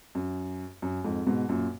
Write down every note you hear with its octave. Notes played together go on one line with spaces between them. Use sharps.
F#2
F#2
F2 G#2
G#2 B2
F#2 A#2